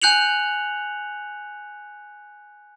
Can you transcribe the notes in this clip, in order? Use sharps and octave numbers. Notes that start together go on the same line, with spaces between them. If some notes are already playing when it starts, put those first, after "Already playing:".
G#5 F#6 G6 C#7 F7 F#7